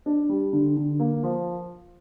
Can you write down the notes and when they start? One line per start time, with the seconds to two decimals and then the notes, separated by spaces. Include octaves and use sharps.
0.06 D4
0.29 G3
0.53 D3
0.77 D3
1.00 A#3
1.23 F3